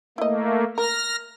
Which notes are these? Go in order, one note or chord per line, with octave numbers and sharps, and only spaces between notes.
A3 A#3 E4 D#5
A#4 F6 A#6